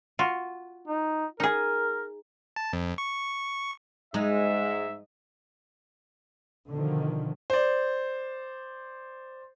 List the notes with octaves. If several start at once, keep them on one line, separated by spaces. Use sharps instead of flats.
F4 F#4
D#4
D#4 G#4 A#4
A5
F2
C#6
G#2 G#3 D#4 E5
B2 D3 D#3 F3
C5 D5